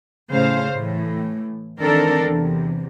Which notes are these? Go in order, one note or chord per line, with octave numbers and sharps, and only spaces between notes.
A2 C#3 C5 F5
A2 E3
D#3 E3 C4 D4 A4 A#4
E2 C3